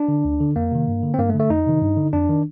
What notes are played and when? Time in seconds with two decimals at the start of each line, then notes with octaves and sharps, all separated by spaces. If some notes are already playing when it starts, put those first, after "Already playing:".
Already playing: D4
0.08 D3
0.25 D2
0.41 D3
0.56 F2 A#3
0.72 C3 D#3
0.88 G2
1.03 D3
1.14 C4
1.18 G2 A#3
1.30 A3
1.34 D3
1.40 A3
1.50 F2 D#4
1.66 C3 D#3
1.81 G2
1.97 D3
2.13 F2 D4
2.29 D#3